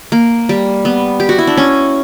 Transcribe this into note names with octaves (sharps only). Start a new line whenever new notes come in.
A#3
G3
B3
G4
F#4
E4
D4
C#4